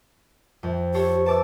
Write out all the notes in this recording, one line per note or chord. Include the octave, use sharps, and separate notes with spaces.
F2
G4 A4 C5 C#5
B4 A5 D6 E6